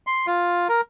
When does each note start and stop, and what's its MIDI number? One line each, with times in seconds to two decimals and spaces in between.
0.07 0.27 84
0.27 0.68 65
0.69 0.81 70